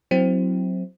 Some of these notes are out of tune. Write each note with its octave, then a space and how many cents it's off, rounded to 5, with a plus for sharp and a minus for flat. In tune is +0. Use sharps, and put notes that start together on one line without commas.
F#3 -5 C4 +0 E4 -10